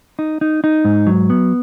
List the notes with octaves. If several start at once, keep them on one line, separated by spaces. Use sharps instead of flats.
D#4
D#4
D#4
G#2
F#3
B3